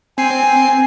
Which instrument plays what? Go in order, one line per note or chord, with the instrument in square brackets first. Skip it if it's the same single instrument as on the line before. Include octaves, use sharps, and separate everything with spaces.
[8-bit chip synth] C4 C7 [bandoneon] G#5